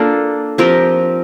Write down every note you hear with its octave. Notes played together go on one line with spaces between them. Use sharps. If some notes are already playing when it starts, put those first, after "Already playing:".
Already playing: A#3 D4 F4 A4
F3 C4 G4 A#4